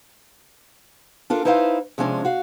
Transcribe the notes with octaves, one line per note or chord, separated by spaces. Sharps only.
D4 F4 A4 A#4
D#4 E4 B4 C5 D5 F5
C3 F3 G#3 C#4 D4
F#4 F5